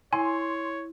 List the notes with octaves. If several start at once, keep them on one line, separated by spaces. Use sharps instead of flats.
E4 C#5 G#5 C6